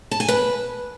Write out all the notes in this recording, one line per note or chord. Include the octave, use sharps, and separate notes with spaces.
A5
G#5
B4